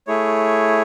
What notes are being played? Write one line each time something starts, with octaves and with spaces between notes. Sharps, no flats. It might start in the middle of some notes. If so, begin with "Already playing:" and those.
A3 E4 G#4 C#5